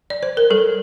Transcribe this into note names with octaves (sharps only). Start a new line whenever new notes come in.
D5
C5
A#4
G3 A4